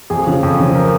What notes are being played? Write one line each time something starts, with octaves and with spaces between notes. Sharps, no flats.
F2 G#4
C#3 F3
F2
C#3 F3
A#4